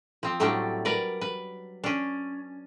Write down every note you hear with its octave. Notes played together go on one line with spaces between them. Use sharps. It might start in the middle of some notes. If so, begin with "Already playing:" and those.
F3 C4
A2 F#3 G3 A3 D4
A#4 B4 D5
B4
C#4 D4